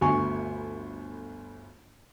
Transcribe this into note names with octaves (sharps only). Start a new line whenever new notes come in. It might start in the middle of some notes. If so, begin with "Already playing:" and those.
G1 D2 G#5 C#6